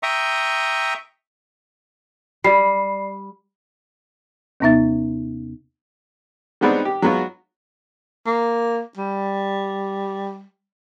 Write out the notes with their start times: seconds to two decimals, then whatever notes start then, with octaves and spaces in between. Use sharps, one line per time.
0.03 E5 G5 A#5 C#6 D#6
2.44 G3 D5 B5 C7
4.60 D#2 C3 B3 D#4 E5 A6
6.61 G3 G#3 B3 C4 D4 D#4
6.85 G4
7.02 F#3 G#3 B3 F4 F#4
8.27 A#3
8.98 G3